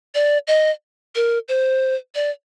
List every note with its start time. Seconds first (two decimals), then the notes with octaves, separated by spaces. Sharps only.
0.15 D5
0.47 D#5
1.15 A#4
1.48 C5
2.15 D5